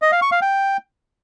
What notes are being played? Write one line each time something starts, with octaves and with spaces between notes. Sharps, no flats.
D#5
F5
C#6
F5
G5